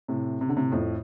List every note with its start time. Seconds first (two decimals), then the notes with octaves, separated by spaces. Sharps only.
0.08 A2 C3
0.41 C3
0.49 D3
0.56 A2 C3
0.72 F2 A2